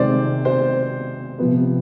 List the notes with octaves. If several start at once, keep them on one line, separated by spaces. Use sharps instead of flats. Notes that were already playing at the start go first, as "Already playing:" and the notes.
Already playing: C3 D#3 G#3 C5 D5
C5
C3 F3 B3